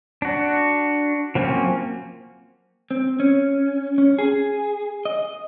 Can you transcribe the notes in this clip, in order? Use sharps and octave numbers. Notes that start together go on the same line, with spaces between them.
D4 F#4
F3 F#3 A#3 C4 C#4
C4
C#4
C#4
G#4
D#5